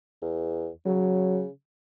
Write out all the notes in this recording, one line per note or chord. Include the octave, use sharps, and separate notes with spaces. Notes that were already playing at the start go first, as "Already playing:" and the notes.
E2
C#3 F#3